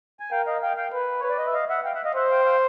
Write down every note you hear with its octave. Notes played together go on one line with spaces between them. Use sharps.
G#5
A#4 F5 G5
D#5 F5
F5 G5
F5 G5
B4
B4 C#5
D5
D#5
E5
D#5 F5
E5 F#5
F5 G5
E5 F#5
D#5 F5
C5 E5 F#5
F5 G5
F5 G5